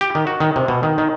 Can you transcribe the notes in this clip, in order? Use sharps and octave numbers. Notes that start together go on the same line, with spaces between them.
G4
D#3
F#4
D#3
C3
B2
D#3
D#3